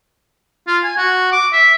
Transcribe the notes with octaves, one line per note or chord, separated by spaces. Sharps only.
F4
G#5
F#4
D6
E5